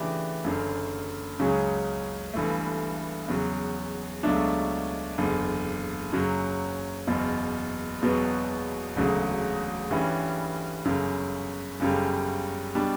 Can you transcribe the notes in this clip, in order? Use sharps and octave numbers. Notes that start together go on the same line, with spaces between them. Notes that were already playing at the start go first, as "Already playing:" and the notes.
Already playing: C#3 E3 A3 D4 G4
F#1 F#2 D3
C#2 C#3 F#3 C#4
G1 G2 E3 A3
E2 C#3 F#3
C#2 B2 F#3 A3 D4
F#1 E2 D3
F#2 C#3 F#3
F#1 E2 B2
E1 E2 B2 F#3 B3
E1 D2 C#3 F#3
G2 E3 G3 C#4
G1 F#2 C#3
G1 F#2 C#3 G3
B2 G3 D4